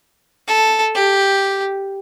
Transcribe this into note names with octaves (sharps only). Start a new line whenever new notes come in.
A4
G4